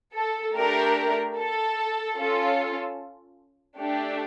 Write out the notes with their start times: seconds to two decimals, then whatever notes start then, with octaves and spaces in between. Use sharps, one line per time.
0.15 A4
0.55 A3 D4 G4 A#4
1.36 A4
2.17 C#4 F4 A4
3.79 A3 D4 G4